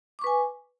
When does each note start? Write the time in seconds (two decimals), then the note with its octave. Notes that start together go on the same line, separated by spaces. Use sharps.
0.19 D6
0.21 C#6
0.24 B4
0.27 G#5